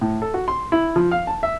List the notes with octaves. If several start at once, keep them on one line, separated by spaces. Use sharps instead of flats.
A2
A4
F#4
C6
E4
F3
F5
A5
E5